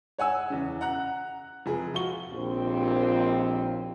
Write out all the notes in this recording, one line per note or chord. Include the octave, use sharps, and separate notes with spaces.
C#5 F#5 G#5 E6
E2 C#3
F#5 A#5 F#6
F1 G#4
F3 F4 F#4 C#6 G7
A#1 D#2 C4